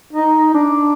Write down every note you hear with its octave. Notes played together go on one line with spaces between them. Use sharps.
D#4
D4